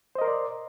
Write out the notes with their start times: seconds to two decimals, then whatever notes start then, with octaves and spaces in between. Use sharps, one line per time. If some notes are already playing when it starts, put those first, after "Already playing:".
0.15 C5
0.18 D#5
0.22 A#4
0.25 C6
0.28 D5